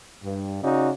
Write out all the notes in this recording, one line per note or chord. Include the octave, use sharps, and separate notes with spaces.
G2
C#3 C#4 D#4 F#4 D5